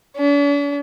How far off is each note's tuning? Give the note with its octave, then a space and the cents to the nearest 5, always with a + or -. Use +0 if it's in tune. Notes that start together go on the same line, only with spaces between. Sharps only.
D4 -45